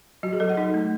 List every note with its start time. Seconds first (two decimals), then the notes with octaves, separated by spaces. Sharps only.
0.23 F#3 F#4
0.33 G#4
0.40 F#3 A4
0.49 F#5
0.57 D#4
0.74 A3